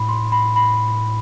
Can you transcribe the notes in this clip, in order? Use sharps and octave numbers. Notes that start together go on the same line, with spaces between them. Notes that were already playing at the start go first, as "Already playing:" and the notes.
Already playing: A2 B5
C6
B5
B5